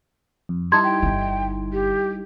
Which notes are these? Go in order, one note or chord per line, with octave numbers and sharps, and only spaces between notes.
F2
G3 D#4 E4 A5 C6 G#6
G5
G1 D3
G4